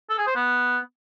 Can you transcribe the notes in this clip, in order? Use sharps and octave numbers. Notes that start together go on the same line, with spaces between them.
A4
G#4
C5
B3